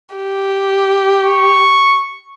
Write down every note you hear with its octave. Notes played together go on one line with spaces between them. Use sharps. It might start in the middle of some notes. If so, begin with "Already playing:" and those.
G4
C#6